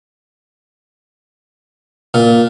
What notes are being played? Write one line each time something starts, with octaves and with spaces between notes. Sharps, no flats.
A#2